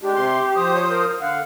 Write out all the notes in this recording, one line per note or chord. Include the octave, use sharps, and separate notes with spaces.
G#3 D4 G4
C3 C6
F3 C5 D#6
C#5
A#4
D3 F5 F#5